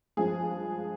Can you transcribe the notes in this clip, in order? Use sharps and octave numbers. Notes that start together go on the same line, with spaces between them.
G2 F3 G#3 G#4